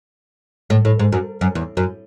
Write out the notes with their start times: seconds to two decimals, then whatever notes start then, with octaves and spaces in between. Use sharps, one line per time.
0.70 A2
0.85 A2
0.99 G#2
1.12 F#2
1.41 F#2
1.55 E2
1.77 F#2